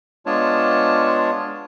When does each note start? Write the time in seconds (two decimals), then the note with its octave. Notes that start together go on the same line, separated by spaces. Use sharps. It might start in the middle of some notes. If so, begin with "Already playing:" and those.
0.26 G#3 B3 D4 F4 C#5 A5